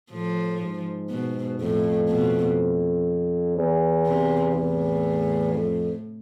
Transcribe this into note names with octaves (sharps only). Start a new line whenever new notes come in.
A2 F3
G#2
B2
F2 A2
B2
E2
C3
E2 A2
F2